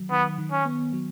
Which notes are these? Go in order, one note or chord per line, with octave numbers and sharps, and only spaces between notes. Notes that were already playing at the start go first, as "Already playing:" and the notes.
Already playing: D#3 F#3
D#3 B3
D#3
C#4
B3
F#3